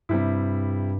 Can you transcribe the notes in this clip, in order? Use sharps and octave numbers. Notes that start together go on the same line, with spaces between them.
G2 C3 G3 E4